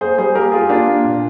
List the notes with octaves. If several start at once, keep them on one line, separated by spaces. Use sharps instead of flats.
A#3 G#4 C5
G3 G#4 C5
A#3 G4 A#4
A#3 F4 G#4
G4
A#3 D4 F4
A#3
A#2